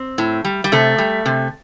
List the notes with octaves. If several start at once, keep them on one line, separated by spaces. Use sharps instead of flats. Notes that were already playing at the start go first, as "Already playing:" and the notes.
Already playing: C4
A2
G3
G3
C3 A3
G3
C3